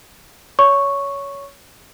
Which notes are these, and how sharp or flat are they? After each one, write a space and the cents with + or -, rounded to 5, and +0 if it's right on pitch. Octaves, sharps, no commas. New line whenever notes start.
C#5 +20 C#6 +0